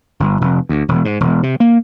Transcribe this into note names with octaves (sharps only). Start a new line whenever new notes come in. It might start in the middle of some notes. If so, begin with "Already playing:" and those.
G1
F1
D2
E1
G#2
E1
C3
A#3